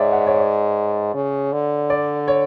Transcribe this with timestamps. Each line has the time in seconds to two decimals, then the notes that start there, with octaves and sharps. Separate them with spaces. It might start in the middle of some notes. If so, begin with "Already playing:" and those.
Already playing: G#2 C#5 D5 E5
0.13 F#5
0.27 C#5
0.38 D5
1.14 C#3
1.52 D3
1.90 D5
2.28 C#5